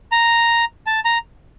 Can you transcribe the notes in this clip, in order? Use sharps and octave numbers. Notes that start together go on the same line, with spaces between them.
A#5
A5
A#5